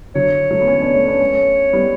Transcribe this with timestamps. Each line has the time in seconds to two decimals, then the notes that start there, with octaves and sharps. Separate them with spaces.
0.15 D3 F#3 C#5
0.51 F#3 A3
0.61 B3
0.68 A3 C#4
0.81 B3 D4
0.94 A3 C#4
1.08 B3 D4
1.20 A3 C#4
1.73 G3 B3